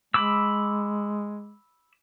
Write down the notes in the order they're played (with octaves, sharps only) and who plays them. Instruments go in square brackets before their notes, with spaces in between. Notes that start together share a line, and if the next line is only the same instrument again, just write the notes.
[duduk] G#3 [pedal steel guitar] B5 D6 E6